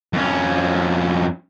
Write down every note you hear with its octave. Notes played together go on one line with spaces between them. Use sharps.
F2 C#4